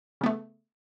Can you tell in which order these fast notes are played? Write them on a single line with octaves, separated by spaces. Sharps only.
C#3 B3 A3